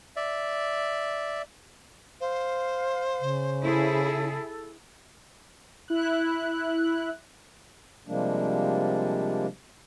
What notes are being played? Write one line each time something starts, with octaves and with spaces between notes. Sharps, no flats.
D5 E5
C5 F5
C#3
E4 G#4 A4
E4 F#6
C3 F3 G3 G#3 A#3 D4